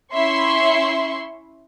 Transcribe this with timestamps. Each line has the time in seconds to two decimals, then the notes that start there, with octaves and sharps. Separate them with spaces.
0.13 C#4 E4 E5 C6 C#6